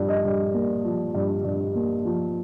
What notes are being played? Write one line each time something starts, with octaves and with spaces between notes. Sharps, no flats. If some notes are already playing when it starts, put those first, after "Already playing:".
Already playing: G2 F3
D#5
G2
A#3
F3
G2
G2
A#3
F3